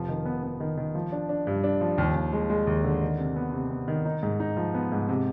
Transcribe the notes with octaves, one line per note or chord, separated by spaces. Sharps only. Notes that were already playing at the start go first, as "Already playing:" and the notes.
Already playing: F1 F3
D#3
B3
B3
D#3
D#3
F3
D4
D4
G2
D4
F3
D#2
D#2
G#3
G#3
D#2
D3
D#3
C3
B3
C3
B3
D#3
D#4
G#2
D#4
F3
B3
G#2
C3